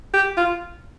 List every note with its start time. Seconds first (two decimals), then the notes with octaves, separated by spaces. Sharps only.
0.14 G4
0.37 F4